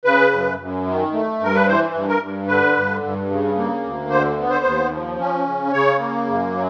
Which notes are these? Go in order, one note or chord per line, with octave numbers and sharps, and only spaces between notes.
C#3 B4
F#2
F#2
D#3
A3
G2 A#4
B4
E3 C5
G2
A#4
G2
D3 B4
G2
G2
C#3
A#3
D2
D3 C5
B3
C5
D#2
F3
C#4
C#3
C#3 C#5
A#3
F#2
F#3